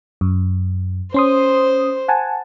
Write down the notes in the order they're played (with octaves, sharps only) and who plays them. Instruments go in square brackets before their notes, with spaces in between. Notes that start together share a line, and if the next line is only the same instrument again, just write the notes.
[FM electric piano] F#2
[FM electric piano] C#4 C6 D#6 [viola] C5
[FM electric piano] F#5 G#5 A5